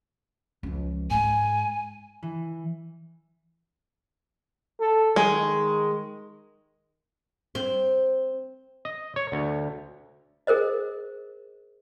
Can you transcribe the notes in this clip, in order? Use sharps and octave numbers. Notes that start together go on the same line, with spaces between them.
C#2 F3
G#2 G#3 G#5
E3
A4
D#3 G#3
C4
D#5
C#5
D2
G#4 A#4 C5 D#5